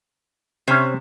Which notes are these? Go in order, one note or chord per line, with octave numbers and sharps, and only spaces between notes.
C3 C#4 C5